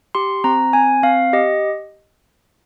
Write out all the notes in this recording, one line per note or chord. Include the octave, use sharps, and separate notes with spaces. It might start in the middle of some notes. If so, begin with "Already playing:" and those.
G4 C6
C4 A#5
C4 G#5
C4 F5
G4 D#5